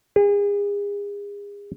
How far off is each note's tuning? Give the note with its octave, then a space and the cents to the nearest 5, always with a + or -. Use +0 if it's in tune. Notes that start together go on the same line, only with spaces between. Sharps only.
G#4 -35